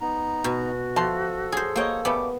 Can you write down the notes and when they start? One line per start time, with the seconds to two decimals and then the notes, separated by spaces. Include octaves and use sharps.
0.01 B3 D#4 A#5
0.44 B2 F#4
0.96 F3 A4 E5 A5 C6
1.52 F#3 G#4 C5
1.76 F#3 A#3 C#5 D#5 G5
2.05 C#3 G3 A3 B3 D6